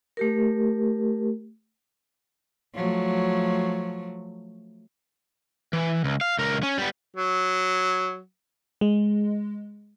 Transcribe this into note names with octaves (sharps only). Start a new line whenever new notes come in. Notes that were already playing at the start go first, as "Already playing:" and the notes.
A3 G4 A#4
F3 F#3 A3
E3
C#2
F5
C#2 A#4
C#4
G3 B3
F#3
G#3